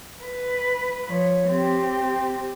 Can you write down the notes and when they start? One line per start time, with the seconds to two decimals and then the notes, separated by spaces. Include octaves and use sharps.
0.24 B4
1.08 F3 C#5
1.49 C4 G4